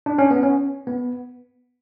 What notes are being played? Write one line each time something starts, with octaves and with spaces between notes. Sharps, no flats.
D4
C#4
B3
C#4
B3